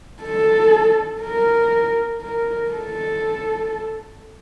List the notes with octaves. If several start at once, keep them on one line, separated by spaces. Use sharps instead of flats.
A4
A#4
A#4
A4